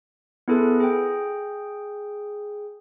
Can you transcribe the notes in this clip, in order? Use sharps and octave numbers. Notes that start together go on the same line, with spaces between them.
B3 E4 G#4 A4 B4
G#4 G5